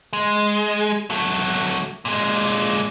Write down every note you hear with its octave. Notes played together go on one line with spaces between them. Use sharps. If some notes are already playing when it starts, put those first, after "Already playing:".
G#3
F#3 A3
A#2 G#3